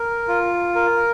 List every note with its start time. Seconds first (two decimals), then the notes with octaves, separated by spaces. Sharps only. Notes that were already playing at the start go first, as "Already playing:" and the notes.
Already playing: A#4
0.28 F4
0.75 A#4